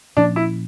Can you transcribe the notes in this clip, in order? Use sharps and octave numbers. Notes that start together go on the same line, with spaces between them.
A#2 F3 A#3 C#4 D4
E4